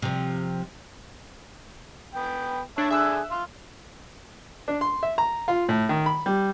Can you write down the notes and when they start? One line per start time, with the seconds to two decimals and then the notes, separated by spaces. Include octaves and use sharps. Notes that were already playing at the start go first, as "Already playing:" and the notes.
0.02 C3 F3
2.15 B3 G5
2.78 D4 C#5 E5 A5
2.91 D3 G#4 E5 E6 F#6
3.31 F5 C6
4.68 D4
4.81 C6
5.03 E5
5.18 A#5
5.48 F4
5.69 A2
5.89 D#3
6.06 B5
6.26 G3